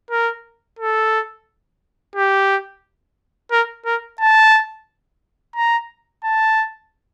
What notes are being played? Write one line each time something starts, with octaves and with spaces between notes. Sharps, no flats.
A#4
A4
G4
A#4
A#4
A5
A#5
A5